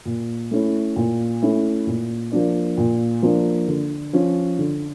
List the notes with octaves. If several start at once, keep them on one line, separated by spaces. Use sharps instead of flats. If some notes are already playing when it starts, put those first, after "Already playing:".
A#2
A3 C#4 E4
A#2
A3 C#4 E4
A#2
F3 A#3 D4
A#2
F3 A#3 D4
D3
F3 C#4
D3